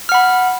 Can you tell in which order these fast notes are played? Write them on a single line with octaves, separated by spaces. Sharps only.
F6 F#5 B5